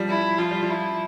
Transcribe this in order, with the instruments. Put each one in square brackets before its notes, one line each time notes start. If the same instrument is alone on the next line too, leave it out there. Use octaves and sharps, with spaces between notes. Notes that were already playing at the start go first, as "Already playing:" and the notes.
Already playing: [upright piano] F3 G3
[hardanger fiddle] E4
[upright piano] F3 [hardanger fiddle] F4
[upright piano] G3
F3
[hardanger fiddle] E4